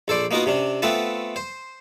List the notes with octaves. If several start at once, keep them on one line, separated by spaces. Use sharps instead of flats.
A#1 A4 C5 D5
A#3 B3 D#4 F4 F#4 A#4
C3 C#4 D4
A3 B3 C4 F4 B4 A5
C5